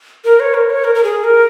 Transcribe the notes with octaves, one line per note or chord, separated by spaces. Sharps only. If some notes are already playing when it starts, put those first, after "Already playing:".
A#4
C#5
A#4
C#5
A#4
A#4
G#4
A#4